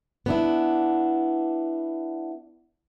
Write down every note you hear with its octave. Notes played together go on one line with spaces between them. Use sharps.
B3 D4 E4